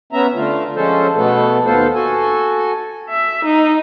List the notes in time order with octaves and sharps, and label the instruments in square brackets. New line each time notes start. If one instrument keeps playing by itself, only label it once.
[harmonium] B3 C#4 E5 A#5
D3 A3 F4
F3 G#3 C#4 A4 C5
B2 A3 B3 A4
D#2 B3 F4 A4 C5
F#4 A4 G#5
[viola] E5
D#4